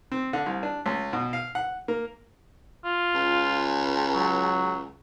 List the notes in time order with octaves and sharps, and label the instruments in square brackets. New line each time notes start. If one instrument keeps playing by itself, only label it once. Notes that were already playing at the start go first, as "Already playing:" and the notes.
[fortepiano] C4
D3
C2
D4
C#2
B2
F5
F#5
A#3
[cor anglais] F4
[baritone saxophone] C#2
[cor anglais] F#3